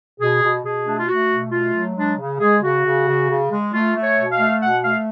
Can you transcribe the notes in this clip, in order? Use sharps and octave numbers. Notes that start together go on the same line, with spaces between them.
B2 G#4
B2
B2 G#4
A3 D4
F4
A3 F#4
B2
A3 F4
F#3
G#3 D4
C#3
G#3 G#4
C#3 F#4
C#3
C#3
C#3
G#3
A3 F4
A3
C#5
B2
F5
A3
B2 F#5
A3 F5